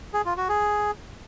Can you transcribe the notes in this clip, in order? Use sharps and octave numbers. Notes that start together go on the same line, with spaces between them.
G#4
F4
F#4
G#4